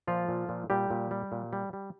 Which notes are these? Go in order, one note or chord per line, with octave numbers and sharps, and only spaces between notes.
A#2 F3 F4
A#2
A#2
A#2 G3 G4
A#2
G3
A#2
G3
G3